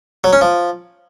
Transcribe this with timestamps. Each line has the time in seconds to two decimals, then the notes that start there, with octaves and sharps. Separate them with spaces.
0.24 F#3
0.33 C#4
0.41 F3